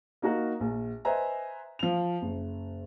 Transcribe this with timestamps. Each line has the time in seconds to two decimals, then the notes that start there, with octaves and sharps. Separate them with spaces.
0.22 A#3 D#4 F#4 A#4
0.60 A#1
1.05 B4 C5 D#5 E5 G#5 A#5
1.79 F3 F7
2.22 F#1